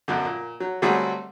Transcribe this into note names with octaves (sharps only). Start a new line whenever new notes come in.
B1 F#2 D3
A#2
F#3
D3 F#3 G3 A3 C4 G#4